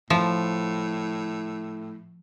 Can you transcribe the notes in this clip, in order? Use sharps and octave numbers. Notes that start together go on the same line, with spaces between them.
A2 F3